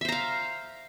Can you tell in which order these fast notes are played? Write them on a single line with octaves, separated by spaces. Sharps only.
E5 C5 A#5 F5